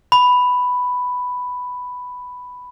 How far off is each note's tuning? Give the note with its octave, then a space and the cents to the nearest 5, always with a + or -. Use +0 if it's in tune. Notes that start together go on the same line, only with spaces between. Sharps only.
B5 +5